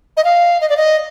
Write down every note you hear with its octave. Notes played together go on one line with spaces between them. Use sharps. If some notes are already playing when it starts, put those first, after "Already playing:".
D#5
F5
D#5
D5
D#5